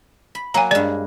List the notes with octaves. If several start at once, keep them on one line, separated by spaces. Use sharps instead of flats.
B5
F#3 A#3 G#5 A#5
G2 G#3 D5